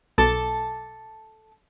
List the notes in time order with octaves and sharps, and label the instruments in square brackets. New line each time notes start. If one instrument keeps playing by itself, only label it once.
[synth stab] B1 [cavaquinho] A4 A5 D6